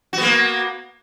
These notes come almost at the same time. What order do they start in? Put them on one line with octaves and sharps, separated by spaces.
F#4 B3 A#3